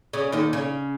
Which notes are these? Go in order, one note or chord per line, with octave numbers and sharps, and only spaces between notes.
C#3
D#2 D#3
C#3